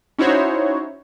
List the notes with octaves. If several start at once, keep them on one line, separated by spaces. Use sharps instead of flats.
C#4 D#4 E4 F#4 C5 C#5